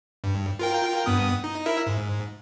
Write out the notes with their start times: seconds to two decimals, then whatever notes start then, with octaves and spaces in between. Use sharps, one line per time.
0.24 G2
0.59 F4 A#4 G5
1.06 G2 B3 D#6
1.44 D#4
1.66 E4 A#4 E5
1.87 G#2